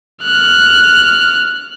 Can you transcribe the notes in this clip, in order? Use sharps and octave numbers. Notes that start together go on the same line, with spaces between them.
F6 F#6